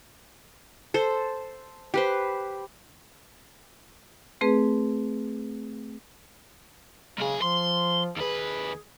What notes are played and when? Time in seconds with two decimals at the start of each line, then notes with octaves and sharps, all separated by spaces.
0.94 A4 C5
1.94 G4 B4 C5
4.41 A3 C4 G#4 B4
7.19 B1 C#3 G#4
7.42 F3 C6
8.17 D#2 G#4 B4